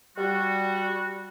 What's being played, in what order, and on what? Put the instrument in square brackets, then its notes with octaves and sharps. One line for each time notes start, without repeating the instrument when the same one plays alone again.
[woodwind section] G3 F#4